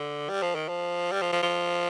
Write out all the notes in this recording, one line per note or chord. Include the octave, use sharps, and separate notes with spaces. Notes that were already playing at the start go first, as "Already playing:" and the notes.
Already playing: D3
G3
F3
D#3
F3
G3
F3
F3
F3